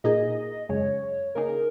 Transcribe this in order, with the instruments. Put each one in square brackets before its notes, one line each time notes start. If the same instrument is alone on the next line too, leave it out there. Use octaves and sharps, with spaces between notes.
[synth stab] A#2 A#3 D#4 G#4 [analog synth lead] D#5
[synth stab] F#2 C#3 G#3 [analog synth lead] C#5
[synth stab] C#3 A#3 D#4 G#4 [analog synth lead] A#4